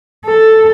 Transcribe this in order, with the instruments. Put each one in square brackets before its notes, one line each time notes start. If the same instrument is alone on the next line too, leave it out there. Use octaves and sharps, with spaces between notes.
[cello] A4